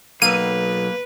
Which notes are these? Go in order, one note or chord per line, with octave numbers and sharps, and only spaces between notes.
B1 A#3 B4 D#7